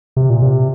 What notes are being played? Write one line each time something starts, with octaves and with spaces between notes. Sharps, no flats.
C3
A#2
C3